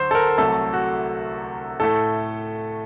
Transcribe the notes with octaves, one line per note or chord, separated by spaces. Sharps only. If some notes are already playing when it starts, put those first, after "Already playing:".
Already playing: D2 F#3 C5
A4
A#4
C2 C3 F#3 A3 A4
F#4
A2 A3 A4